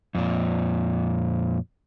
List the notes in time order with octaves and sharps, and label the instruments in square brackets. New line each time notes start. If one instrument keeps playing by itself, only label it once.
[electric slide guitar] F2 A#2